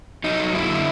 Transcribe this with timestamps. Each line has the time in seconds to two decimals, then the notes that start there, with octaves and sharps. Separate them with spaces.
0.24 F#3 D#4
0.39 F#3
0.54 F#2 E4
0.70 D3